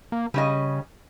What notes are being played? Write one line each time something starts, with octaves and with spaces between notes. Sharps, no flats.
A#3
C#3 G3 C#4 D#5